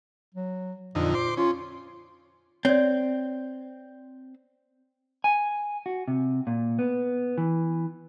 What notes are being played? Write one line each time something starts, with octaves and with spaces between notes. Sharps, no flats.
F#3
F2 A#2 D3 D#4
C5 C6 D6
C#4 F4
C4 C#5 D5
G#5
F#4
C3
A#2
B3
E3